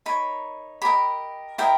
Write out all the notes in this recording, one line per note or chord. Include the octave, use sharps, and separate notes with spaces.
D#4 A#4 C#5 B5
G4 A#4 D#5 B5
E4 G4 A#4 D#5 G5